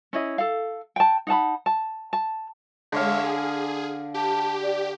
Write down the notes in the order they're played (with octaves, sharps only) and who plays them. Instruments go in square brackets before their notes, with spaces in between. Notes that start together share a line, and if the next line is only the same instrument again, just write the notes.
[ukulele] C#4 E4 D#5
A4 F5
G5 A5
D#4 F#5 A5 B5
A5
A5
[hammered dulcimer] D3 F5 [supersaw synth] G#3 C#5 E5
[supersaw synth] G#4
[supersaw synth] G4 [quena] A5
[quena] D5